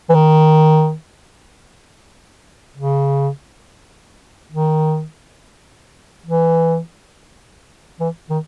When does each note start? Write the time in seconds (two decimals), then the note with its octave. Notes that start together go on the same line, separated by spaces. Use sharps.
0.09 E3
0.14 D#3
2.76 C#3
4.51 D#3
6.26 E3
8.00 E3
8.30 D#3